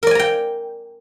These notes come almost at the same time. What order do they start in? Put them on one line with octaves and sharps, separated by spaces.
A#4 D5 G#5 A#5 G5